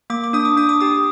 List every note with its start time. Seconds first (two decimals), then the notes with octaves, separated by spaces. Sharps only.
0.10 A#3 D6
0.24 D6
0.33 D4 D#6
0.45 D6
0.57 D4 D#6
0.69 D6
0.81 G4 D#6